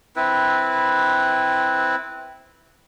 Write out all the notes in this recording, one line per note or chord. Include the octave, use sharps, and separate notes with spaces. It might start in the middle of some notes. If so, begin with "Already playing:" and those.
C4 E4 B4